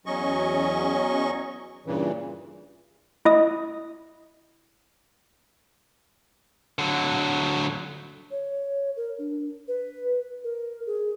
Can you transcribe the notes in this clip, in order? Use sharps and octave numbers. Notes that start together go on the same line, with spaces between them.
E2 F#3 C#4 D#5 C#6
G2 A#2 C#3 E3
E4 D#5 D#6
D3 F#3
C#5
A#4
D4
B4
A#4
G#4